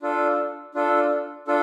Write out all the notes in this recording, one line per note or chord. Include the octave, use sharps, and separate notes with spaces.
D4 F4 A4
D4 F4 A4
D4 F4 A4